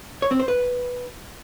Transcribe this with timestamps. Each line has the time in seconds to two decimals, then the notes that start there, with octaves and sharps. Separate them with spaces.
0.22 C#5
0.31 C4
0.39 C5
0.48 B4